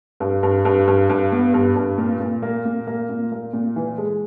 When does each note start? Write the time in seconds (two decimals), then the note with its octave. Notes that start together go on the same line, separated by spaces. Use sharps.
0.20 G2
0.43 G2
0.65 G2
0.87 G2
1.10 G2
1.32 B3
1.54 G2
1.76 G2
1.98 A#2
2.20 A#2
2.42 A#3
2.65 A#2
2.87 A#3
3.09 A#2
3.32 A#3
3.53 A#2
3.76 E3
3.98 G#3